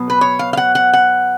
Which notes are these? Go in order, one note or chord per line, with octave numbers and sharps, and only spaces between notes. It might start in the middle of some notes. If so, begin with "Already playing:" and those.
Already playing: B2 F#3 B3
B4
C#5
F5
F5
F#5
F#5
F#5